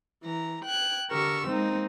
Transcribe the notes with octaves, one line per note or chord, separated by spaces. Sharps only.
E3 A#5
G5 F#6 G#6
D3 G4 A#4 C#6 E6
G#3 A#3 C4 D#4